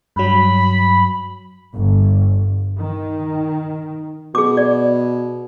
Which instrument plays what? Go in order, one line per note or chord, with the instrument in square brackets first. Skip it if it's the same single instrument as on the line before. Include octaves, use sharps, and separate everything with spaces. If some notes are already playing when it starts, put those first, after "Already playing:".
[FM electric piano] G2 F#3 [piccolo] B5
[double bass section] G1
D#3
[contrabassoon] B2 [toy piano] G#4 D6
[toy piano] D5